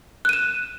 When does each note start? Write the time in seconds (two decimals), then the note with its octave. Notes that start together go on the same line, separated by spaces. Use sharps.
0.25 F#6
0.29 D#7
0.33 E7